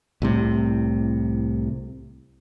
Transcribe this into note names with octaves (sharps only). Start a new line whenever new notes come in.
C2 A2 C3